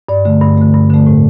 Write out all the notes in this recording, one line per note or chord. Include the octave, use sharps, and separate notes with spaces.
G2 D5
D3 A3
G2
D3 A3
G2
D3 A3
A2